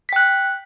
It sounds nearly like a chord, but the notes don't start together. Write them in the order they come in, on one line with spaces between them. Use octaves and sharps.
B6 G5 F#6